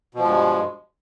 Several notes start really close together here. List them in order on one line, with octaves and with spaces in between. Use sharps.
B2 F3 G#3 G2